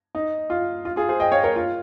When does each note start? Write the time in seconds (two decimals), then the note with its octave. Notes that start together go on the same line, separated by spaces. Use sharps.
0.15 D#4
0.50 F4
0.85 F4
0.96 F4 G#4
1.09 G#4 C5
1.20 D#5 G5
1.32 C#5 F5
1.44 A#4 C#5
1.56 F4